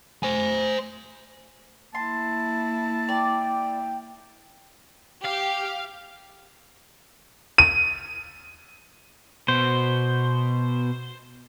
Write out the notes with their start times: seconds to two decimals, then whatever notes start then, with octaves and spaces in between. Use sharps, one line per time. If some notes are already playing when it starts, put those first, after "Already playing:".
0.23 C5 G#5
1.95 A#3 E4 A5 C6
3.09 D5 G5
5.25 G4 F5
7.58 D#7
9.48 B2 C5